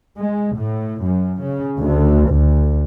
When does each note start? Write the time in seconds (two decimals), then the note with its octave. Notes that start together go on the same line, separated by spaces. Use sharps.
0.17 G#3
0.56 A2
1.03 F#2
1.42 C#3
1.79 D2
2.30 D2